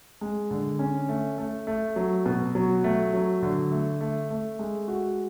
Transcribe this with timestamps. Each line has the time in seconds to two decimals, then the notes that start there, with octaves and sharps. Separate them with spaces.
0.21 G#3
0.51 D3
0.79 C#4
1.09 A3
1.38 A3
1.67 A3
1.96 F#3
2.26 B2
2.55 F#3
2.84 A3
3.13 F#3
3.42 D3
3.71 A3
4.01 A3
4.30 A3
4.59 G#3
4.88 F#4